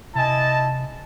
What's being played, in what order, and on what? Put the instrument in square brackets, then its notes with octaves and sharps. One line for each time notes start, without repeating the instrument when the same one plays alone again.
[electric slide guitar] C3 G#5 [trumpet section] E4 D#5 A5